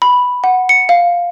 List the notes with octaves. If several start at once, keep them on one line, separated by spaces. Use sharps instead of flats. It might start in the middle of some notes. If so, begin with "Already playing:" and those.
B5
F#5
C#7
F5